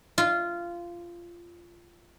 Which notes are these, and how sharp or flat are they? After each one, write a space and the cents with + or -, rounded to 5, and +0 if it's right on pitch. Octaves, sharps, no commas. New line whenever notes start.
F4 -15